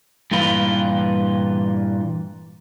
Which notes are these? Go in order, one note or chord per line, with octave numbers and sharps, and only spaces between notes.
G2 A#2 E3 F4 B4